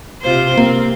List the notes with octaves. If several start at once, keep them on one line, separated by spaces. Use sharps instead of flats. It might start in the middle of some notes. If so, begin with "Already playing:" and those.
C3 F4 C5
A#3 C4